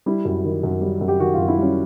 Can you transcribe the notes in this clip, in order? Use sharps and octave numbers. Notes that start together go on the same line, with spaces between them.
G3 E4
F#2
D#3
F#2
G3
F#2
G4
D#3 F#4
F#2 F4
E4
G3 C#4